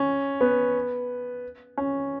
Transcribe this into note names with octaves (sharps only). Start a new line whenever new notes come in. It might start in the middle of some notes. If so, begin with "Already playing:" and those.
Already playing: C#4
B3
C#4